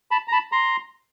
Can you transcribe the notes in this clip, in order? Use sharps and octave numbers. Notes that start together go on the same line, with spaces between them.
A5 B5
A#5
A5 B5
A#5 C6